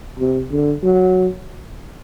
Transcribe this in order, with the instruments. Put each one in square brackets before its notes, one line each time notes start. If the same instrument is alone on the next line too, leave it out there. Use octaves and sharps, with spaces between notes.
[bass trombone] C3
D3
F#3